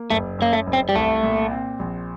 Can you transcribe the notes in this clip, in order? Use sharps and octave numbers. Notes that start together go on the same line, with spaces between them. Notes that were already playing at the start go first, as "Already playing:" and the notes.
Already playing: A#3
F#1 A3
F#2 A#3
A3
F#1
C4
G3
C2 A3
A#2
C4
A#1